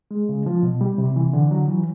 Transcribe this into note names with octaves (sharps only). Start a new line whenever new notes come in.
G#3
C#3
F3
B2
G3
C3
E3
D3
F#3
E3